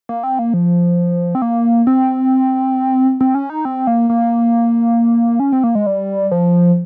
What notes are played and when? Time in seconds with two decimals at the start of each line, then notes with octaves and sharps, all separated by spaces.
0.09 A#3
0.23 C4
0.39 A#3
0.54 F3
1.35 C4
1.42 A#3
1.87 C4
3.21 C4
3.35 C#4
3.50 D#4
3.65 C4
3.87 A#3
4.10 A#3
5.40 C#4
5.52 C4
5.64 A#3
5.75 G#3
5.87 G3
6.32 F3